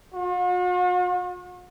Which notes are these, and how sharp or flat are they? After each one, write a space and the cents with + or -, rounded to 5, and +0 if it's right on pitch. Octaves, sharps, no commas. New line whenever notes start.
F#4 -45